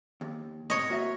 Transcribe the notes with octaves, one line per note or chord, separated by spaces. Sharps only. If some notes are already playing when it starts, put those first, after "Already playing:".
D#2
A2 C3 C#5 D#5
A#3 F#4 E5